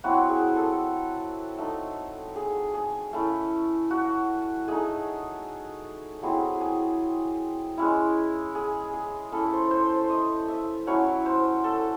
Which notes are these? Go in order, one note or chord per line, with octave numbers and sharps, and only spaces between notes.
F#3 C4 E4 F#4
G#4
A4
A3 D#4
G#4
G#4
A3 C#4 E4
F#4
A3 D#4 G#4
F#3 C4 E4 G#4
G#4
G#3 C#4 E4
G#4
G#4
A3 C#4 E4 A4
C5
C5
C5
D#5
E5
F#3 C#4 E4 C#5
C5
A4